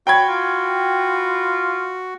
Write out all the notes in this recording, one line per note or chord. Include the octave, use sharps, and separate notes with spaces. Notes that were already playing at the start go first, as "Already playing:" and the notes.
F#4 C#5 G5 B5 G#6
F4